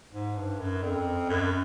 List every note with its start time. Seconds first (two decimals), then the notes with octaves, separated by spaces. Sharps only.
0.13 G#2
0.36 G2
0.60 F#2
0.83 F2
1.29 F#2